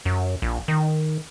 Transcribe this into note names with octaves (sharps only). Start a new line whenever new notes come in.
F#2
A#1
D#3